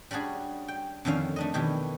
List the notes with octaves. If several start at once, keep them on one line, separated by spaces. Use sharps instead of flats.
G3 C#4 D4 F#4 G#4
G5
F2 D3 D#3 C#4 F5
A3 D4 D#5
B2 D#3 E3 G4